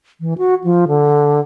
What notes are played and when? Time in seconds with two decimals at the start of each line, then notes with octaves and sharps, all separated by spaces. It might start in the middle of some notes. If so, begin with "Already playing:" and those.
0.21 E3
0.38 F#4
0.64 F3
0.88 D3